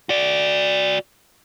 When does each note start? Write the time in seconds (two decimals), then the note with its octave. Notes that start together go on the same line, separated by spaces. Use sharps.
0.09 F#4 D5